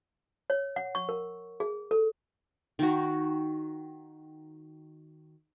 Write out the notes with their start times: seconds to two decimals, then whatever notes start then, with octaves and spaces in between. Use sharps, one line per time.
0.50 C#5
0.76 F#5
0.95 C#6
1.09 A#4
1.60 G#4
1.91 A4
2.79 D#3 F#4